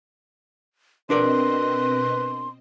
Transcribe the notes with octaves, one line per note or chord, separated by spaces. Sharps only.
B2 C4 D4 A#4 B4 D5 D#5 C6